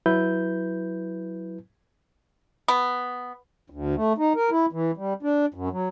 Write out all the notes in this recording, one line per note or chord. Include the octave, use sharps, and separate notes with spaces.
F#3 E4 B4 G6
B3
D2
A3
D#4
A#4
E4
E3
G3
D4
F#2
F#3